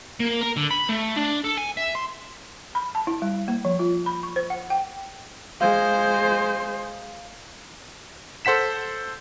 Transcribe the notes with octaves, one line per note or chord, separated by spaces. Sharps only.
A#3
A#4
D3
B5
A3
D4
A4
G#5
E5
C6
B5
A5
E4
G3
A#3
F3
F4
B5
C#6
C5
F#5
G5
G#3 C5 F5
A4 C5 F#5 B6 E7